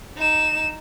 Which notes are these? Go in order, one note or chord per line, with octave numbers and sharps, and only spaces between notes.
D#4 E7